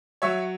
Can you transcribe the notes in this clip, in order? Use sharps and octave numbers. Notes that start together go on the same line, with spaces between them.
F#3 C#5 E5